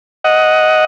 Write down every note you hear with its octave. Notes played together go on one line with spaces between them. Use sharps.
D#5 F#5